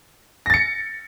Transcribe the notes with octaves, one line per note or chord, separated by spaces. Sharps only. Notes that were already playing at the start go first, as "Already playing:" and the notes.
A6 A#6 C#7